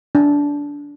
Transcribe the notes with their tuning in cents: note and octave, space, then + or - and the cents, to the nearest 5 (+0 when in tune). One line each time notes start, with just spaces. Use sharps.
D4 -20